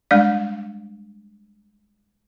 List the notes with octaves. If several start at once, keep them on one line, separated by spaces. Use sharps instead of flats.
G3 G#3 D4 D5 F5